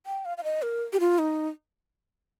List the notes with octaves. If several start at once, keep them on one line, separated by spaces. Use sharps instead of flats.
G5
F5
F5
D#5
A#4
G4
F4
D#4